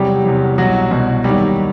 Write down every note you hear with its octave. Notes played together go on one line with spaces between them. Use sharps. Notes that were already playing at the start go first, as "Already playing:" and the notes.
Already playing: E2 C3 F#3 G3 G4
E2 C3 F#3
C2 B2 F#3 F#4
C2 B2 F#3
D#2 D#3 F#3 G3 G4